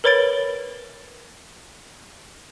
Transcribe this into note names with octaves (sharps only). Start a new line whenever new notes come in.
A#4 B4 C#5 B5 A6 D7